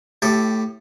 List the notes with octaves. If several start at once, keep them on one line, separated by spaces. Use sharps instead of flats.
A2 G4 A4